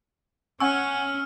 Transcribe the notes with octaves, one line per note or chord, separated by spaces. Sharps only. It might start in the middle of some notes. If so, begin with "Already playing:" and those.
C#4 F#5 G#5 C#6 E6 F6